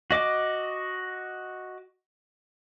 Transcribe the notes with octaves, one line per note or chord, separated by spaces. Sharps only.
F#4 D#5 D6